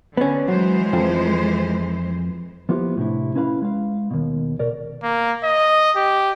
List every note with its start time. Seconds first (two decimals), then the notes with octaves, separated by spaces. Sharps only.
0.17 D3 B3 C#4
0.48 E3 F#3 G#3 C5
0.93 F2 F3
2.69 F3 A#3 B3 E4 F4 G4
2.97 A2 C3 D4 E4
3.35 C#4 E4 B4 F5 B5
3.62 G#3 F5
4.11 D#2 B2
4.59 B2 A#4 D5
5.03 A#3
5.44 D#5
5.96 G4